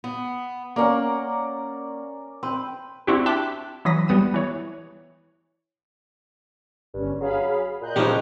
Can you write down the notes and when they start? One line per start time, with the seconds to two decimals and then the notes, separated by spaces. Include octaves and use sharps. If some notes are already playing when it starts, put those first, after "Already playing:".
0.04 B3
0.76 A#3 C#4 A#4 D5 F#5
2.43 C4 B4 G5
3.07 C4 D4 E4 F#4 G4
3.26 E5 G5 A5 D6 F#6 B6
3.85 E3 F#3 D#6 A#6 B6
4.08 G3 B3 D#6 D#7
4.34 E3 C#5
6.94 G1 G2 C#4
7.20 F#3 G#4 F5 B5
7.81 A#2 D#5 F#6 G6
7.96 C#2 A#2 C#3 F3 G#3 D#4 G4